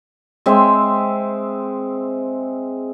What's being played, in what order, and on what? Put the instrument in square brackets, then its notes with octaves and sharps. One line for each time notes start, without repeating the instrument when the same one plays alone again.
[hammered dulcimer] G#3 C4 E5